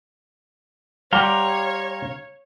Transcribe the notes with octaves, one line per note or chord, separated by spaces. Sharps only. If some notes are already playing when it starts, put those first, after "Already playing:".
G3 G4 C#5 F5 F#5 A#5 C6